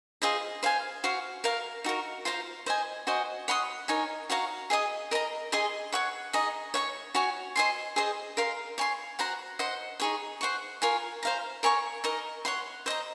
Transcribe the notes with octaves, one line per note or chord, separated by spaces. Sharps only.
F4 G#4 C5 D#5
C5 F5 G#5
F#4 C5 F5
A#4 F5 A#5
D#4 F#4 A#4
F4 C5 F5 A#5
C5 D#5 G#5
F#4 C5 D#5 G#5
C#5 F#5 C6 D#6
D#4 A#4 C#5 G#5
F#4 C#5 F5 A#5
G#4 D#5 G#5 D#6
A#4 D#5 A#5
G#4 D#5 G#5 C6
C#5 F#5 C#6
D#4 G#4 D#5
C#5 F#5 C#6
F#4 C#5 G#5
C5 D#5 G#5 C6
G#4 C5 D#5
A#4 F5 C6
C#5 G#5 C6
F#4 C5 F#5 A#5
C5 D#5 F#5
D#4 G#4 C#5
C5 F#5 C#6
F4 A#4 C#5 G#5
C5 F5 A#5
A#4 C#5 G#5 C#6
D#4 A#4 D#5
C#5 F#5 C6
C5 D#5 A#5